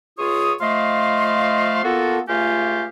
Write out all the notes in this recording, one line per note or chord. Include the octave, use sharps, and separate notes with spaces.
C#2 F4 G#4 C#5 D#6
F3 A3 D#5 F5 C6
A#3 B3 F4 F#4 A4
C#2 A3 F4 G4 F5 G#5